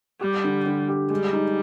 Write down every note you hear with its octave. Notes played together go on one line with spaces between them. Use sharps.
G3 G4
D3
D3
G4
G3 G#3
D#4